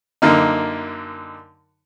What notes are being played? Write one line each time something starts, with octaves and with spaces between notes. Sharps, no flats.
F#2 D3 A#3 D#4